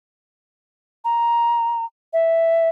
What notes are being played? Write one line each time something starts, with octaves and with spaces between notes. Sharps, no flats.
A#5
E5